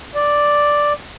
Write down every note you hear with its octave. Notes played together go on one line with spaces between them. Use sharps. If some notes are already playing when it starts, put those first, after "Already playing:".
D5